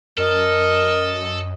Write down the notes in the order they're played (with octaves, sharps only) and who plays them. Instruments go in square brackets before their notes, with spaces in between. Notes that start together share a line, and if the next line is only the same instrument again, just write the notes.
[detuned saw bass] F#2 [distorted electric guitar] A4 [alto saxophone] A#4 [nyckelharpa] D#5